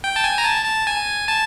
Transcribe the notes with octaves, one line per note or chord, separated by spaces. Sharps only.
G5
A5
G#5
A#5
A5
A5
G#5
A5